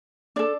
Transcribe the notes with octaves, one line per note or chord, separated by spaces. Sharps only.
D4 A4 D5